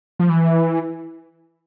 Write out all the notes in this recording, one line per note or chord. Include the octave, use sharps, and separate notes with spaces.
F3
E3